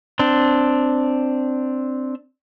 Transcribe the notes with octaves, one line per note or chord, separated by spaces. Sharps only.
C4 D4